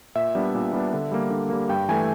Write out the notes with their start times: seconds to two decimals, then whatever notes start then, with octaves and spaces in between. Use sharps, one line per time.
0.15 A#2 E5
0.35 G3 B3 D4
0.55 A#2
0.73 G3 B3 D4
0.93 D3
1.11 G3 A#3
1.30 D3
1.50 G3 A#3
1.69 G2 G5
1.89 E3 A3 G#5